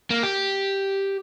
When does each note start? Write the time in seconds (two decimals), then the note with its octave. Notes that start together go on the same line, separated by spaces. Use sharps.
0.10 A#3
0.23 G4